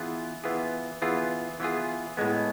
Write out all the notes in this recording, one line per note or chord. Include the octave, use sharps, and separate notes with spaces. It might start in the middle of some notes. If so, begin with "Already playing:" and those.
Already playing: E3 B3 F4 G#4
E3 B3 F4 G#4
E3 B3 F4 G#4
E3 B3 F4 G#4
A2 G#3 B3